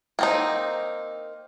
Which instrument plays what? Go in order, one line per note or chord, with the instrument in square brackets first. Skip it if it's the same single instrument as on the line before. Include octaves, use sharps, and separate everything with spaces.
[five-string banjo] A#3 C4 D#4